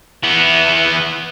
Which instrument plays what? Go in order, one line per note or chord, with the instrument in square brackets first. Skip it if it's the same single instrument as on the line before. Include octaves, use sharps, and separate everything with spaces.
[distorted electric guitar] E3 B3